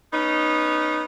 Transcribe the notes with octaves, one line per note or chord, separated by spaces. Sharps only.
B3 C#4 D#4